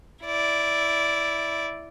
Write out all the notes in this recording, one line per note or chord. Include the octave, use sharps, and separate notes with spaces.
E4 D5